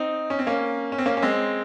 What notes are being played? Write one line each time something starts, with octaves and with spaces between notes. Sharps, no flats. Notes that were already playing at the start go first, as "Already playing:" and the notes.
Already playing: C4 D#4
C#4
C4
A#3 C#4
C#4
C4
A#3 C#4
C#4
G#3 C4